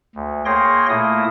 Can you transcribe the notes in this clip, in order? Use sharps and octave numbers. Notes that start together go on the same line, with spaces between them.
D2
A#3 G#4 C#5 G5 C6 A#6
A#2 A3 A#3 E4 D#6